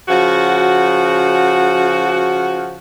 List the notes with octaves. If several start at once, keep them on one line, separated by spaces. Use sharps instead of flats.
C#3 F3 F#4